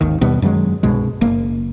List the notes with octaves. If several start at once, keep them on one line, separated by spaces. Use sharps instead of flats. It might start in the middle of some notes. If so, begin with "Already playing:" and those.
G#1 D#2 D#3
D#2 B2 G3 B3
F#2 D#3 F#3 G#3
C2 G2 B2 G#3
F#1 A#3